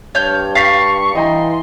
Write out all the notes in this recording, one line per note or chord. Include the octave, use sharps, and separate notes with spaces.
G2 C#5 A5 F6 G6
F5 C#6 A6 B6 C7
E3 D#5 G5 A#5 C6